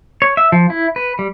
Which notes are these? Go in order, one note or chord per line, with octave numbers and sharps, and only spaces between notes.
C#5
E5
F3
E4
B4
G3